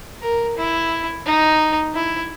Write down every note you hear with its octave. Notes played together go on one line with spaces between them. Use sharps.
A#4
E4
D#4
E4